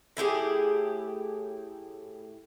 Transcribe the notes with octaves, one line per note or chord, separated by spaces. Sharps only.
A2 E4 G4 G#4